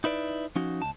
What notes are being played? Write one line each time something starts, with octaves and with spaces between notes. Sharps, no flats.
D#4 E4 B4 D5
F3 C#4 D#4 F#4
C#2 A5